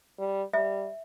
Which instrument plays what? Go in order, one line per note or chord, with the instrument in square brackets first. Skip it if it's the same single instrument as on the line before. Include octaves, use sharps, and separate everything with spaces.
[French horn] G3
[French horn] G3 [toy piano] E5